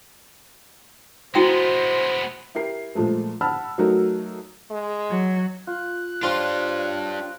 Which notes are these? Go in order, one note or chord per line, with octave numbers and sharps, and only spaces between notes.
G#3 B3 E4 F#4 C5 G5
E4 G4 A#4 C7
A#2 F3 G#3 A3
F#5 A5 B5 E6 F6
F#3 A3 D#4 F#4 A#4
G#3
F#3
F4 F#6
D4 F4 G4 C5 C#5
C#5